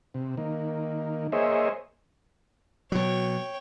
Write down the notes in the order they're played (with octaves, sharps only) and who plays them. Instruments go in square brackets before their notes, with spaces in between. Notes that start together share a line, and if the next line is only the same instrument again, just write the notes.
[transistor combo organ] C3
D#3 A#3
A#3 G#4 C5 C#5 D#5 E5
[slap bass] B2 F#3 [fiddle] C#5 G5